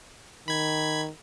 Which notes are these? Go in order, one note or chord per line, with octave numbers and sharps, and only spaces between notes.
D#3 B5 G#6